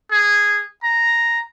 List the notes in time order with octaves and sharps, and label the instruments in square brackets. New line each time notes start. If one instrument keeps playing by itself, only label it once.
[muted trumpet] G#4
A#5